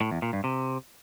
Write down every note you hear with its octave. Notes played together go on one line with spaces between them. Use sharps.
A2
E2
A#2
G2
C3